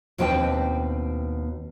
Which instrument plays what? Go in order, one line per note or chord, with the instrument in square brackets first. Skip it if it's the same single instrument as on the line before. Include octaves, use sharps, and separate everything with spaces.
[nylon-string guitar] D#2 B2 C4 D4 B4 G5